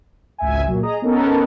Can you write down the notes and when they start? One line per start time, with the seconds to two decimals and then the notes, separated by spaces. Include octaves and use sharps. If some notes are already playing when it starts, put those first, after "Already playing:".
0.38 G#1 C#2 E5 G#5
0.67 A#2 F#3
0.83 G#4 D#5 A#5 D#6
1.02 B3 C#4 D#4 A4 A#4